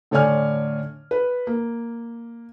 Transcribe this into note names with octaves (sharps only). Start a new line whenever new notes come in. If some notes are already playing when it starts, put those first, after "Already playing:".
A2 D3 C#5 D5 G#5 F6
B4
A#3